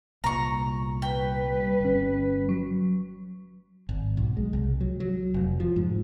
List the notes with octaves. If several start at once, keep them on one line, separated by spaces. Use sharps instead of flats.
C2 A#2 A#5 C#6
G3 B4 G5
G1 C#4
F#3
G#1
B1
G#3
C2
F#3
F#3
F1
F3
G#2